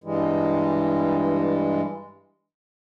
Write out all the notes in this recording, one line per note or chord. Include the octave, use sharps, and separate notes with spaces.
G2 E3 G3 G#3